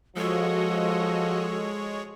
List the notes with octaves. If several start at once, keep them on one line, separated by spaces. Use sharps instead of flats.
F3 G#3 F#4 A4 C#5 D#5